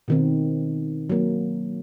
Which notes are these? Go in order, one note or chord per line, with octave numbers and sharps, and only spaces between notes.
B2 D#3 C4
F#3 A#3